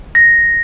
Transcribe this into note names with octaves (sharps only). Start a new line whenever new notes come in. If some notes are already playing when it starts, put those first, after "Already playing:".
A#6